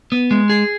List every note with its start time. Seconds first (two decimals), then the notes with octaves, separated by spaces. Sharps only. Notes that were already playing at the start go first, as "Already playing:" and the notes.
0.12 B3
0.31 G#3
0.49 G#4